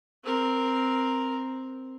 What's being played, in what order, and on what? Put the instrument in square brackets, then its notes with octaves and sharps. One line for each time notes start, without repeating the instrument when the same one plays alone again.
[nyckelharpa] C4 A#4